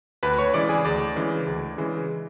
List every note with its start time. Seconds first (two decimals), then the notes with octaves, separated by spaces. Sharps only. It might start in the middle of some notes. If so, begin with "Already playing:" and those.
0.23 D2 B4 B5
0.39 C#5 C#6
0.54 C#3 E3 G#3 D5 D6
0.69 G#4 G#5
0.85 D2 D5 D6
1.16 C#3 E3 G#3
1.47 D2
1.78 C#3 E3 G#3